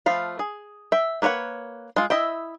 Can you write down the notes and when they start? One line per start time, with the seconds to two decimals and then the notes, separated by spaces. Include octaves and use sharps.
0.06 F3 A3 F5 B5
0.39 G#4
0.92 E5 G5
1.22 A#3 B4 C#5 D#5 F#5
1.96 G#3 F4
2.10 E4 D#5 E5 G5